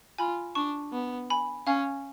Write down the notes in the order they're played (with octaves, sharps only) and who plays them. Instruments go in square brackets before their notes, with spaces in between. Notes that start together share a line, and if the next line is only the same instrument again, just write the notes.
[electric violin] F4 [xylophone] G#5 B5
[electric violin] D4 [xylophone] A5 C#6
[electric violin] B3
[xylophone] G#5 B5
[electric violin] C#4 [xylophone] F5 G#5